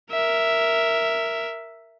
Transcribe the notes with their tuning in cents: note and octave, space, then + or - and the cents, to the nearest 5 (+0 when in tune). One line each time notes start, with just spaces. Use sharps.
A#4 -5 E5 +0